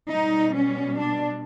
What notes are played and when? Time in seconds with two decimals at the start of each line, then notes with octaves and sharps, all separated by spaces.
0.12 B2 G3 D#4
0.56 C#4
0.99 D4